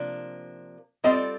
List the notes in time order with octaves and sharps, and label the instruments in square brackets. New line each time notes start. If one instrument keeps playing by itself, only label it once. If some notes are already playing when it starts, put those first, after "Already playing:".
Already playing: [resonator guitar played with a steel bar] C3 F3 A#3 D4
[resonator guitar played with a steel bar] G3 C4 F4 A4 [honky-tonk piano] D#5